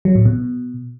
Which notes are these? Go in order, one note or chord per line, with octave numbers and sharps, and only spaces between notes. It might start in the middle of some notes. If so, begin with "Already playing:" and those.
F#3
A2
B2